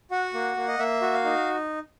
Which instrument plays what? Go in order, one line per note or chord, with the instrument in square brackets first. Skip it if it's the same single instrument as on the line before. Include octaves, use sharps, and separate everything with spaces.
[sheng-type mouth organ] F#4 F#5
A#3
A#3
D#5
A#3 E5
F#4
F5
D#4